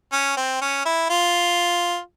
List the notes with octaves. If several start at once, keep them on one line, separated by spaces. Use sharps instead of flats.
C#4
C4
C#4
E4
F4